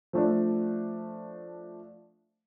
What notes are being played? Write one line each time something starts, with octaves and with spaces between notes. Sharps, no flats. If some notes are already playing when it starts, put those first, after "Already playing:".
F3 A3 D4